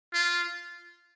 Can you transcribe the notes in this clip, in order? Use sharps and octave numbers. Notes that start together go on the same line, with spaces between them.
F4